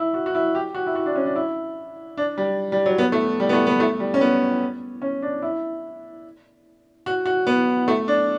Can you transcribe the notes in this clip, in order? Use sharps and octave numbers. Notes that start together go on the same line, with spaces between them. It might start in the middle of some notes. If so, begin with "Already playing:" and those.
Already playing: E4
F#4
F#4
E4
G4
F#4
E4
F#4
D4
C#4
D4
E4
D4
G3
G3
F#3
B3
A3
G3
B3
A3
B3
A3
G3
C#4
B3
C#4
D4
E4
F#4
F#4
B3
A3
D4